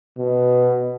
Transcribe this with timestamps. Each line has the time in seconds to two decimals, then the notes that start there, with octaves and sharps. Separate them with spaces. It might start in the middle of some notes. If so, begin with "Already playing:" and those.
0.18 B2